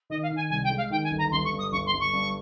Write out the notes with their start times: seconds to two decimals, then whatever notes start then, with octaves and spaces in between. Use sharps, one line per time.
0.10 D#3 D#5
0.22 F5
0.30 D#3
0.36 G#5
0.49 C2 G#5
0.64 G5
0.70 G#3
0.77 F5
0.90 D#3 G5
1.04 G#5
1.11 G1
1.18 A#5
1.31 G1 C6
1.44 C#6
1.52 G2
1.59 D#6
1.72 G1 C#6
1.86 C6
1.92 G1
2.00 C#6
2.13 G2